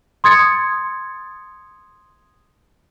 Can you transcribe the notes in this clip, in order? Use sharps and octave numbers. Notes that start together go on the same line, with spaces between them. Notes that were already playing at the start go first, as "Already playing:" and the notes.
C6 D#6 G#6 A6 C#7